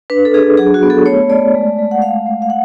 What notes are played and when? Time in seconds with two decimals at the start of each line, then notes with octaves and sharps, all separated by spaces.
0.10 D4 B4
0.25 A4
0.34 D4 G#4
0.58 F#3 G#4
0.74 F#4
0.83 B3
0.90 A4
1.06 A3 C#5
1.30 A3 D5
1.55 G#3
1.79 G#3
1.91 F#5
2.02 A3 F5
2.26 A3
2.42 F5
2.50 F#5